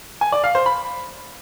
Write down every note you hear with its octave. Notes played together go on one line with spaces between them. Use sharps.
G#5
D5
F5
C5
B5